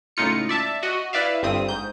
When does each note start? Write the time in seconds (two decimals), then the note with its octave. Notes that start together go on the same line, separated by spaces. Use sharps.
0.17 C#2 A2 D#4 F4 C#7
0.49 D5 E5 A5
0.83 F#4 D#5
1.13 E4 B4 D5 E5 F5
1.43 G1 G2 C4 D#6
1.68 G#2 G6